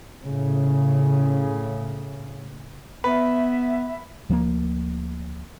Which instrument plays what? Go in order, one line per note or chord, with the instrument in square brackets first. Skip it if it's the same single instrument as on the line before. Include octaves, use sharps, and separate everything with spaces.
[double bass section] A2 C#3
[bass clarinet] B3 [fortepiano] B4 [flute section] E5
[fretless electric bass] D2 F3 A3 A#3